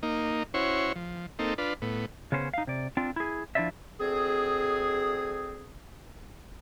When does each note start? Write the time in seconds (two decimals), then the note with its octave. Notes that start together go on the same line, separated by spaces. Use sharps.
0.03 A#3 D#4
0.54 C#4 E4 F#4 C5 C#5
0.96 F3
1.39 A#3 C4 D#4 A4
1.58 D4 F4 B4
1.82 A2 B3
2.32 C#3 B3 C#4 C5
2.54 D#4 F5
2.67 C3 D5
2.97 C4 D4 F4
3.16 E4 G#4
3.55 F3 D4 E4 F4 D5 E5
4.00 D2 C4 G#4